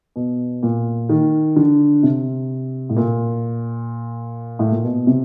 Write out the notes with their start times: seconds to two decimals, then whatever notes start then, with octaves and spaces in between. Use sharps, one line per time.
0.16 B2
0.63 A#2
1.09 D#3
1.56 D3
2.03 C3
2.89 A2
2.97 A#2
4.59 A2
4.72 A#2
4.84 B2
5.07 C3